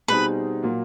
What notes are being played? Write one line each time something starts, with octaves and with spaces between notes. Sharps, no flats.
B2 G3 C4 D#4 G#4 B4
A#2 F#3 A#3